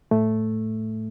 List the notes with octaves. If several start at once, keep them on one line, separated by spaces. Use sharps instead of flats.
A2 A3